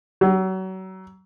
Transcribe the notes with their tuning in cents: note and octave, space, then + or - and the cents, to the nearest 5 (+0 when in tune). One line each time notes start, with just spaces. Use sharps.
F#3 +30